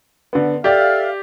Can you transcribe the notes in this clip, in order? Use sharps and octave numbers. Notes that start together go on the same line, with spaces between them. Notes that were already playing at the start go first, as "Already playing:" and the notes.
D3 B3
G4 A4 D5 E5 F5